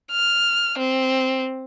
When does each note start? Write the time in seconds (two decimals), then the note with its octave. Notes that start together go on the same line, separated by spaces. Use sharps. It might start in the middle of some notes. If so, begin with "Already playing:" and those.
0.12 F6
0.78 C4